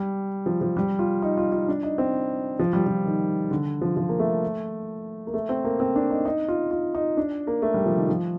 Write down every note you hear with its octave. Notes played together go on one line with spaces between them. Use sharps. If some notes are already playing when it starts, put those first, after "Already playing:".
Already playing: G3
F3
F3
G3
F4
D#4
F4
F4
D4
D#4
C4
F3
G3
F3
D#3
D3
F3
F3
A#3
A3
A#3
A3
C4
A#3
C4
D4
D#4
D#4
F4
F4
D#4
D4
A#3
A3
G3
F3
D#3
F3